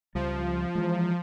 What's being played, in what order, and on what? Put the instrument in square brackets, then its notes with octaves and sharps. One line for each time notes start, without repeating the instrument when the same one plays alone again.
[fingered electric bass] C#2 G3 [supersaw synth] F3
[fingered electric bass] E3 G#3